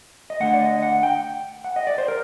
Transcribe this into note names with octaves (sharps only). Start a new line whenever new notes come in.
D#5
D3 A3 F#5
D5
D#5
F#5
G5
F#5
D#5
D5
C5
A#4